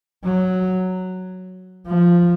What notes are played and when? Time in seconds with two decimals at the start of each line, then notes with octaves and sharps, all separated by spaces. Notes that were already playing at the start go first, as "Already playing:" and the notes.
0.24 F#3
1.86 F3